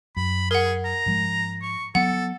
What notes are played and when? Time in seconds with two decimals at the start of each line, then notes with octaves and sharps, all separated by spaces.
0.17 F#2 B5
0.51 G#4 A#4 F#5
0.85 A#5
1.06 G#2 F3 G#3
1.62 C#6
1.95 F#3 B3 A4 F#5